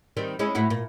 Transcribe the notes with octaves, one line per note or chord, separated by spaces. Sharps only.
D#3 G3 C4
G#3 C#4 E4
A2 E4 F#4
A#2